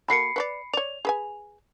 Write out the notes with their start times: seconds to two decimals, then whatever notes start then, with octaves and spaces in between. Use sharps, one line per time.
0.08 A#3 F#4 A4 B5 C7 C#7
0.36 B4 C#5 D5
0.74 C#5 D5 F7
1.05 G#4 B4 G#5